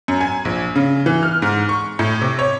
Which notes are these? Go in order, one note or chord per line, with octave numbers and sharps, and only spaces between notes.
F#2
G#5
A#1
C#3
E3
F6
G#2
C#6
A2
C3
C#5